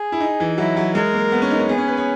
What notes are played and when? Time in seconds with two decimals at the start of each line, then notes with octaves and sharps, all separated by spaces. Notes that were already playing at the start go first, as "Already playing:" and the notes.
Already playing: G#4
0.12 E4
0.20 D#4
0.40 E3
0.58 F#3 E4
0.77 F#3
0.95 G#3 A#4
1.14 A#3
1.32 B3
1.42 C#4
1.51 D#4
1.60 C#4
1.69 B3 G#4
1.78 C#4
1.88 B4
1.97 C#5